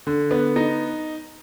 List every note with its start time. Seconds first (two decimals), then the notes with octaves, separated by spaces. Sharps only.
0.07 D3
0.31 B3
0.56 D#4